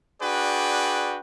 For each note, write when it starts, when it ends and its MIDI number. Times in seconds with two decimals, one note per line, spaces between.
0.22 1.19 62
0.22 1.19 66
0.22 1.19 68
0.22 1.19 71
0.22 1.19 74
0.22 1.19 79